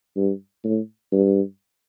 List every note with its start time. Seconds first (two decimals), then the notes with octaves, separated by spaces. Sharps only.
0.16 G2
0.64 A2
1.12 G2